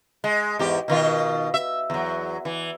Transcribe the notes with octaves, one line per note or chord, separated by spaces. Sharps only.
G#3
E2 G#2 G4
B2 D#3 F4
E5
E2 F#3
E3